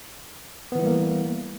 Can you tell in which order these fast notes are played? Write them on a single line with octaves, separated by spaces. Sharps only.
B3 E3 E4 G3 A#3